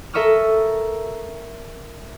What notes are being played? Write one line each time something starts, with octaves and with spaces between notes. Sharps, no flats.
A4 A#4 E5 C#6 D#6 F6